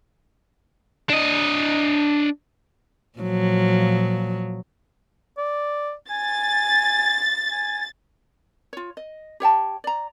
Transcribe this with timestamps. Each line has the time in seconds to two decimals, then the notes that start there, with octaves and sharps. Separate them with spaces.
1.09 D4 D#5
3.19 A#2 F3 F#3
5.38 D5
6.10 G#5 A6
7.51 G#5
8.73 F4 C#5
8.97 D#5
9.40 G4 C#5 G5 A5
9.84 D5 A#5